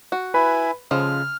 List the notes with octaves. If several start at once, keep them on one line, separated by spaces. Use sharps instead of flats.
F#4
E4 B4 G#5 B5
C#3 F3 G#3 A4 F6